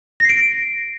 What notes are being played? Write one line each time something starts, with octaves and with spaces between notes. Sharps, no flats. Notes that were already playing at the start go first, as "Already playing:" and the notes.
A#6 C7 D7